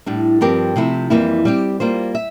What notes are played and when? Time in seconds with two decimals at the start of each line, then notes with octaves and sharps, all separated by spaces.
0.06 A2 G3 D4
0.41 G2 F3 C4 G4 A#4
0.76 C3 F3 A3 E4
1.10 F2 E3 G3 A#3 E4
1.45 G3 C4 G4
1.80 G3 A#3 F4 C5
2.15 E5